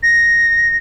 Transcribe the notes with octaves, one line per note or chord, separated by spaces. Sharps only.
A#6